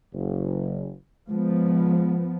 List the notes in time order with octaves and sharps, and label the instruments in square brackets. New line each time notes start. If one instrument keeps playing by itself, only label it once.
[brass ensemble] F#1
[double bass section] F3 B3 [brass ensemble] G#3